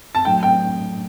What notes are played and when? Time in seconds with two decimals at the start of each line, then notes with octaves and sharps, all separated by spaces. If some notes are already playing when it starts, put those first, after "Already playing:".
0.15 A5
0.25 A2 F#3 A3 D4 G5
0.43 G5